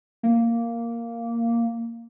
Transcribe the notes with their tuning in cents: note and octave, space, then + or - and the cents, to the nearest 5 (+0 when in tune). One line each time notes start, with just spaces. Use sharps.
A#3 -5